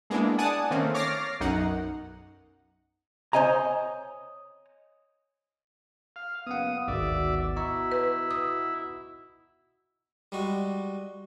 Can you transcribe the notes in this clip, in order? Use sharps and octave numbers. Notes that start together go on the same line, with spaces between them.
G#3 A#3 B3 D4 E4
D5 F#5 G#5 A5 D#6
D#3 A3 A#3 C4 C#4
C#5 D6 F6 A6 A#6 C7
B1 F#2 D#4 F#5
C5 C#5 D#5 G#5 A#5
F5
F#1 B3 B4 F5 F#5 D#6
G#1 D2 B2 D#3 B3 F#4 D5 E5
E4 D#5 A#5 C#6
B4
D#6
G3 G#3 F#4